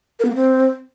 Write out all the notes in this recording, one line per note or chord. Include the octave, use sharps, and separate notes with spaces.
A#4
B3
A#3
C4